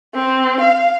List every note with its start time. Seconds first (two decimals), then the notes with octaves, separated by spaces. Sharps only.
0.14 C4
0.60 F5